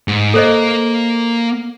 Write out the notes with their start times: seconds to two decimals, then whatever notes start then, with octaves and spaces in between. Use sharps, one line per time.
0.08 G#2
0.34 A#3 A4 C5 D#5